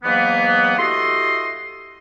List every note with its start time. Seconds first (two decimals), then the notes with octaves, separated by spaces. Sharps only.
0.04 G#2 E3 F#3 A#3 B3
0.78 E4 F#4 G4 A4 D#5 C6